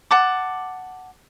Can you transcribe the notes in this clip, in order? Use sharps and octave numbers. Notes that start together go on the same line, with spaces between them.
F#5 A5 D6